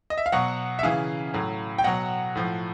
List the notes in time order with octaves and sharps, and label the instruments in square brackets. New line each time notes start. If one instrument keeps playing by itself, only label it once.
[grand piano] D#5
E5
F5
B2 F#3 F#5
E5
C#3 E3 F5
A2 F#3
G5
B2 F#3 F#5
A2 F3